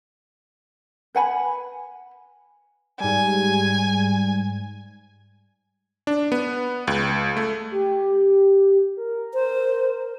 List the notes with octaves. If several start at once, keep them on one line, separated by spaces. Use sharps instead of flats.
B4 F#5 G#5 B5
G#2 G3 G#5
D4
B3
C#2
A3
G4
A#4
C5